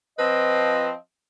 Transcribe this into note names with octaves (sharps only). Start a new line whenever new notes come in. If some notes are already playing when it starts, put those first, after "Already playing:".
F3 C4 B4 D#5